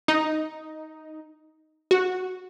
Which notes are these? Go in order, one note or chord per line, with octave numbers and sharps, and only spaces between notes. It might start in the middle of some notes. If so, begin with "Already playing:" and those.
D#4
F#4